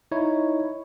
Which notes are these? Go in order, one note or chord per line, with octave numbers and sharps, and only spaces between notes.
D#4 E4 C#5